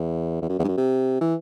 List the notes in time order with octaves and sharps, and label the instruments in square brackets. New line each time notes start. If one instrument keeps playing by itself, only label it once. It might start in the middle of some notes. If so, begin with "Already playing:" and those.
Already playing: [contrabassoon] E2
E2
F#2
E2
G2
F#2
C3
E3